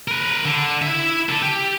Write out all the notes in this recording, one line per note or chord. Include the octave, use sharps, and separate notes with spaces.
A#4 B4
D3
E4 E5
D3 A4
G4